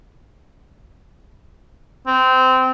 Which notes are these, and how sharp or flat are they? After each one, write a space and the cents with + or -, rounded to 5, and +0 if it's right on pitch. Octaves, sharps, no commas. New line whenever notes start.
C4 -20